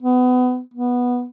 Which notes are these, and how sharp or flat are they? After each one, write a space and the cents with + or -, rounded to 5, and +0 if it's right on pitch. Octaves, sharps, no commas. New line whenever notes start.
B3 +25
B3 -10